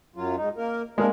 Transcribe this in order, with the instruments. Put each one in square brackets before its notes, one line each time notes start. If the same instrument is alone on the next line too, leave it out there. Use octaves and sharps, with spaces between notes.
[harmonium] F#2 F#3 F4
G#2 D#4
A#3 A#4
[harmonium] C3 D4 A#4 [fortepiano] G#3 A#3